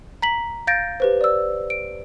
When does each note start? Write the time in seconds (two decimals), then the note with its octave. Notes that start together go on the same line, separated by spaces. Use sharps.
0.22 A#5 B6 F#7
0.67 F5 G6 A6 A#6 D7
1.00 G4 B4 C5
1.21 D5 E6
1.70 D7